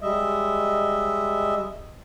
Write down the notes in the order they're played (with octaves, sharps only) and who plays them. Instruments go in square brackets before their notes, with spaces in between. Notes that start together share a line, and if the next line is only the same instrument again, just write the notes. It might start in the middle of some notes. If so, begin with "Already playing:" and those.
[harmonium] G3 G#3 D#5 E5